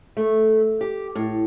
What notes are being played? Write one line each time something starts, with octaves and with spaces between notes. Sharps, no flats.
A3
G4
A2